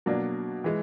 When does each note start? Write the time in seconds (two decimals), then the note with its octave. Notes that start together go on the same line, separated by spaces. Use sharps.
0.06 B2 F#3 A#3 D4
0.64 E3 G#3